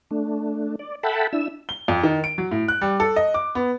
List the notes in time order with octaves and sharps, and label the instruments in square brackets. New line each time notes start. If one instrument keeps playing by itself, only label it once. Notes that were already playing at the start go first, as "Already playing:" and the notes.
[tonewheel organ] A3 D4
D5
A4 E5 F#5 G5 A5 B5
D4 E4 E6
[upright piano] G7
F2
D#3
D7
F#3
A2
F#6
G3
A4
D#5
D6
B3